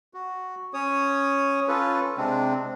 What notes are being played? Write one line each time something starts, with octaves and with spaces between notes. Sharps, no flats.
F#4
C#4 C#5 D#6
C#4 F4 A4 B4
C3 G#3 C4 D4